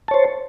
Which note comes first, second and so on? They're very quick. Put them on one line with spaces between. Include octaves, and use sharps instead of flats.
A5 C#5 C5